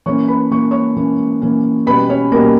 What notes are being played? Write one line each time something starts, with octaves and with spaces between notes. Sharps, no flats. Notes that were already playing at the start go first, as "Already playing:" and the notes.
E3 A#3 C#4 C#5 C#6
B4 B5
E3 A#3 C#4 C#6
C#5 C#6
E3 A#3 C#4
E3 A#3 C#4
B2 G3 C#4 B4 B5
C#4 C#5
B2 G3 A#3 C#4 A#4